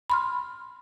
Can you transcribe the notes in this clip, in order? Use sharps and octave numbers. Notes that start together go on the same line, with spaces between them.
B5 C6 F6